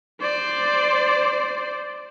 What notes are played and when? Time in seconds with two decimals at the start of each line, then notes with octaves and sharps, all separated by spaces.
0.21 C5 D5